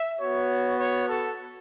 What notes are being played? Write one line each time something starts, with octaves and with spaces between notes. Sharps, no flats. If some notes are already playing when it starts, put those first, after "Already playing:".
Already playing: E5
B3 F#4 C#5
C#5
A4